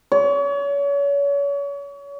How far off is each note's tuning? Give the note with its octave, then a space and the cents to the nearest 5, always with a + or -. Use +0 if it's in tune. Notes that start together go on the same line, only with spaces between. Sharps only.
C#5 +35